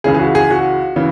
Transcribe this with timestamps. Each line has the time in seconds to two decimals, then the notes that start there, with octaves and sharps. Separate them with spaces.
0.04 C#2 C#3 E3 G#4
0.14 G#4
0.19 F#4
0.35 G#4
0.50 F#4
0.96 C#3 E3